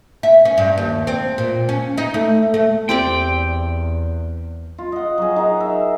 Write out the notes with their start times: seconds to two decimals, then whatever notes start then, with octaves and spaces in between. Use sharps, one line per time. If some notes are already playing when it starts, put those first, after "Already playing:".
0.23 E5
0.45 C#4
0.58 G2
0.78 D#2
1.07 C4
1.38 A#2
1.69 C#4
1.98 D#4
2.14 A3
2.54 A3
2.89 E2 C4 G4 D5 G5
4.78 F4
4.92 D#5 F#5
5.18 F#3 G#4
5.36 D#4 A#4
5.60 E5